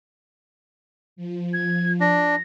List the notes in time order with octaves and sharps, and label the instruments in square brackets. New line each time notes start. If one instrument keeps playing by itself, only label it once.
[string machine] F3
[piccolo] G#6
[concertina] D4 [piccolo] A#6